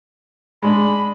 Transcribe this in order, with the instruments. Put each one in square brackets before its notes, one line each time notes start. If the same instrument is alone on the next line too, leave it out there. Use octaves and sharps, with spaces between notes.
[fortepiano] G#3 D4 [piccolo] B5